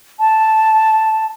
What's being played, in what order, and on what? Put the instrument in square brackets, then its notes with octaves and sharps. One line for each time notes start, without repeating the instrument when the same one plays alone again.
[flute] A5